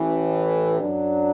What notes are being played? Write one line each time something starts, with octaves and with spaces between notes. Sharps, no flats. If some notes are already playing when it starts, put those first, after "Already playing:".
Already playing: A1 A2 E3
F#2 F#3 D4